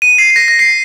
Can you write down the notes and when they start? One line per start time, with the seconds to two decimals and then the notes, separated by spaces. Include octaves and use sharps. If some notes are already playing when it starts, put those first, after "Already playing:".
0.02 D#7
0.18 C7
0.30 C7
0.36 A#6
0.48 A#6
0.59 C7